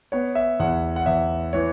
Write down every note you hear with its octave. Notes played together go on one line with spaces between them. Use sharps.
B3 C#5
E5
E2 F#5
F#5
E2 E5
E3 C#5